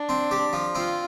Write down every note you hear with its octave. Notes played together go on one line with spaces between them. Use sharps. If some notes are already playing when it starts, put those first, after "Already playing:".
Already playing: D4
C4
G4
F3
C4 F4